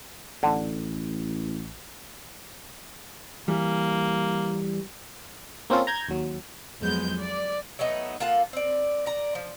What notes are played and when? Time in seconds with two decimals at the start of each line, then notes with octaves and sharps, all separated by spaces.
0.43 A1 D3
3.48 E3 G3 A#3
5.70 A#3 C4 C#4 F4 A4
5.87 A#5 G6 G#6
6.09 D#2 F#3
6.81 F2 F#3 G#3 B3 G6
7.18 D5
7.79 F#3 A3 B3 D#4
8.20 A#3 F4 A4 F#5
8.53 C4 D5
9.06 D5 A#5
9.35 F3